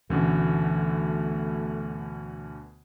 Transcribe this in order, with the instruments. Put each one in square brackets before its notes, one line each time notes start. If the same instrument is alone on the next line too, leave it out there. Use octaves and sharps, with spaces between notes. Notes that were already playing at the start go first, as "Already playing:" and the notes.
[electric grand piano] D2 B2 D3 [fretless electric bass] E3 C#4 [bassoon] A3